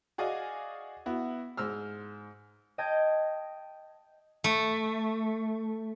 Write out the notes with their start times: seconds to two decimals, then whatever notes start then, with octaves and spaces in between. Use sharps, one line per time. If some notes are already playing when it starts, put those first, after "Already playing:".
0.18 F#4 G#4 D5 D#5 F5 G#5
1.06 B3 E4 F#4
1.57 G#2 C5 E6 F6
2.78 D#5 G5 A5 G6 G#6 A#6
4.44 A3